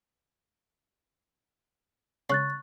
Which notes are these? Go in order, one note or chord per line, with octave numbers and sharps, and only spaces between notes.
C#3 C#6 F#6 A6